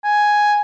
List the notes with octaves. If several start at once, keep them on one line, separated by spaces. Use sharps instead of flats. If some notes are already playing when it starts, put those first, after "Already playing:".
G#5